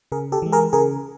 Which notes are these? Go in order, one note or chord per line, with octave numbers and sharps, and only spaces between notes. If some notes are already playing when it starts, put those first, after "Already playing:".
C#3 G#4 A#4
G4 A4
E3 G#3
G#4 A#4
C#3 G#4 A#4